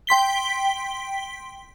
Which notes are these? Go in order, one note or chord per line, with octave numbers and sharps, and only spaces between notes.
G5 C6 B6 G7